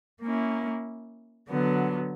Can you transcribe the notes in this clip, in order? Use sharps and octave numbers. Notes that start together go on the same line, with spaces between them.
A#3 C#4 E4
D3 F#3 B3